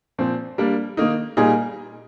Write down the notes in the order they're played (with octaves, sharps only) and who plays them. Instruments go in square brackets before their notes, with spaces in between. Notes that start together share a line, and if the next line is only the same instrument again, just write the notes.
[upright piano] A#2 F3 C4
G3 A#3 D4
D#3 A#3 D#4
A#2 G3 A#3 D#4 G#4